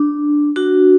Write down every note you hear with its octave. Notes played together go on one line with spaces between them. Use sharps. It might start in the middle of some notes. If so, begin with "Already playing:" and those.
Already playing: D4
D4 F#4